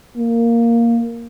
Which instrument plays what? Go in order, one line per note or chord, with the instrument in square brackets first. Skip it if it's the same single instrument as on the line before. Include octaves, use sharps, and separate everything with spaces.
[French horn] A#3